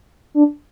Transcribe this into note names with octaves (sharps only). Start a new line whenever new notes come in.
D4